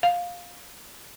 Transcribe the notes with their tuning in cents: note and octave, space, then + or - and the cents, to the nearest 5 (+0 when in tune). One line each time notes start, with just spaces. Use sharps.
F5 +10